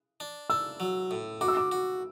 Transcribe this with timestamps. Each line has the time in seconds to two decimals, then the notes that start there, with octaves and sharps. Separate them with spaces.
0.20 D4
0.50 D4 E6
0.80 F#3
1.11 A2
1.41 F#4 D6
1.48 E6
1.57 D6
1.72 F#4